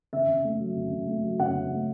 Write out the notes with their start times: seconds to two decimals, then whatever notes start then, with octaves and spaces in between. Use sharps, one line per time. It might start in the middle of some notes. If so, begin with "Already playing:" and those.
0.13 C#3 E5
0.28 C#3
0.44 A3
0.60 F#3
0.76 C#3
0.91 C#3
1.08 A3
1.24 F#3
1.40 C#3 F#5
1.55 C#3
1.71 A3